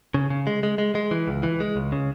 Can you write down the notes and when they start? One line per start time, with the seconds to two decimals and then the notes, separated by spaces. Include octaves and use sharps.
0.14 C#3
0.30 C#3
0.47 G#3
0.63 G#3
0.78 G#3
0.95 G#3
1.11 E3
1.28 C#2
1.43 E3
1.60 G#3
1.76 C#2
1.92 C#3